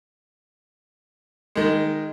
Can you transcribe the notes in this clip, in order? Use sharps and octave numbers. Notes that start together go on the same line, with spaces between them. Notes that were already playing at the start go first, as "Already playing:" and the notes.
D#3 G#3